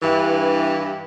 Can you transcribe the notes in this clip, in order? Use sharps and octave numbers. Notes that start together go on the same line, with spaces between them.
G2 E3